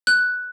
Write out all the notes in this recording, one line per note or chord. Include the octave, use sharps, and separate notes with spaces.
F#6